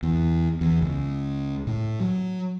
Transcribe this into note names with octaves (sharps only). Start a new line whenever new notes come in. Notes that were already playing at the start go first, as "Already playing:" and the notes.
E2
E2
C#2
A2
F#3